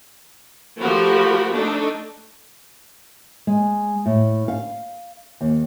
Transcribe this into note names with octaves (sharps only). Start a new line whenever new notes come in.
F3 A3 F#4 G4 A#4 B5
A3 D4 D#4 A4
G#3
A2
F5
D#2